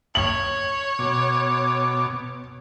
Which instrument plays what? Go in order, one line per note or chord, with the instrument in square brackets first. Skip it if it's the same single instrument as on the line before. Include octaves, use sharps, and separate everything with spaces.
[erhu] C#5 [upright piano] F#7
[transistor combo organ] B2 D6